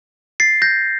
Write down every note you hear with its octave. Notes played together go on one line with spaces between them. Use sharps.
A6 C7
G6 A#6